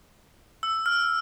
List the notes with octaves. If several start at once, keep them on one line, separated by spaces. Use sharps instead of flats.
E6
F6